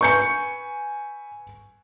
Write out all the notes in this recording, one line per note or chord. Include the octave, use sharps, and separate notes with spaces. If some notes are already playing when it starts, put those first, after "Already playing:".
B4 G#5 C#6 G6 C#7